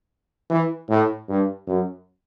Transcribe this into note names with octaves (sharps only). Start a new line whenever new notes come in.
E3
A2
G2
F#2